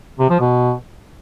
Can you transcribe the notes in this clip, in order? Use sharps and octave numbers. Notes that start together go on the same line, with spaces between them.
C3
F3
B2